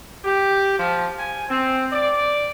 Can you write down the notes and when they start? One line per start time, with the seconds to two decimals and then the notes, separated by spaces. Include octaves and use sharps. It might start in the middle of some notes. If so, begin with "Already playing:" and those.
0.24 G4
0.78 F3
1.18 G#5
1.49 C4
1.92 D5